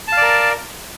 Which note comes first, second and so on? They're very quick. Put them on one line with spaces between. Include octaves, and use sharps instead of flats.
A5 F5 D5 A#4